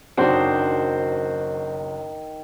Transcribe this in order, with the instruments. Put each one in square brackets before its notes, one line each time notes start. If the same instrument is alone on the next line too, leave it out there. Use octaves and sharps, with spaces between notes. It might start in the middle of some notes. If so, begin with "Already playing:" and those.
[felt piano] F#1 F#3 [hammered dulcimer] D#3 [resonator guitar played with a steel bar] D4 [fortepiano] F#4 C5